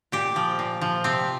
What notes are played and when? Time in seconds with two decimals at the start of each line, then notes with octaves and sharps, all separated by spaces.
0.12 A#2 G4
0.36 F3
0.59 A#2
0.81 F3
1.04 C3 C4